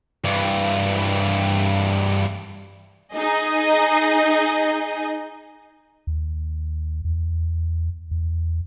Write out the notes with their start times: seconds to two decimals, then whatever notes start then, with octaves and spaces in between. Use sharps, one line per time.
0.24 G2 E3
3.15 D#4 G#4 D#5
6.07 D#2
7.05 E2
8.11 E2